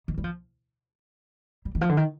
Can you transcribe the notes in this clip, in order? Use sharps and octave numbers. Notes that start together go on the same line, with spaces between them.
D#3
G3
F3
G3
D#3
F3
D3
D#3